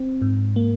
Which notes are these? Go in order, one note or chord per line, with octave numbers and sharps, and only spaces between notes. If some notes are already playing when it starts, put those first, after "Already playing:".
Already playing: C4
G#2
A#3